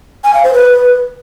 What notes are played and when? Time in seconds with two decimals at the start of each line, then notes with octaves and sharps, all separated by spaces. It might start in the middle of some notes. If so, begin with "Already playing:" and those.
0.24 G#5
0.34 F5
0.44 C5
0.53 B4